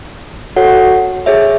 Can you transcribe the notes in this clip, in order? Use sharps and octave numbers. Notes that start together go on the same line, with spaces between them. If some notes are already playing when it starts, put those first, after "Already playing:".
F#4 A4 C#5 F#5
G#4 C#5 E5